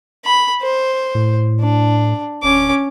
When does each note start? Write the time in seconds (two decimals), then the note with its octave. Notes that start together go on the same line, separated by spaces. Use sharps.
0.25 B5
0.62 C5
1.15 A2
1.60 D4
2.43 D1 C#4 D6